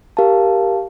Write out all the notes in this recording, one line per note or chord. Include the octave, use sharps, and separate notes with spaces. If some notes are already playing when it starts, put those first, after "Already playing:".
G4 A#4 F5 A5